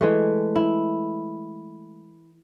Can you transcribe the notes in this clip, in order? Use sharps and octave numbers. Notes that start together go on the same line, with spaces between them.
E3 G#3 A3
E4